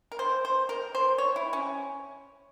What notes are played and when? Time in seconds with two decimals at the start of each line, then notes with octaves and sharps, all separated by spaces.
0.12 A#4
0.19 C5
0.45 C5
0.69 A#4
0.95 C5
1.18 C#5
1.36 E4
1.53 C#4